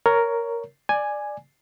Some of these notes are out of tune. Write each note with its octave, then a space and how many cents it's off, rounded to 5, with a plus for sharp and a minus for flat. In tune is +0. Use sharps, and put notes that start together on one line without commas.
A#4 +0 C#5 +15
D5 +15 G#5 +0